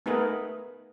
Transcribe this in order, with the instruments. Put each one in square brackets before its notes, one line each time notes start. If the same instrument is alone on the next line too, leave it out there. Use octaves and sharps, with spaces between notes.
[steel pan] A3 B3 D#4 G#4 A#4 B4